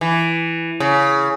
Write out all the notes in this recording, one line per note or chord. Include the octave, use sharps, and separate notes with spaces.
E3
C#3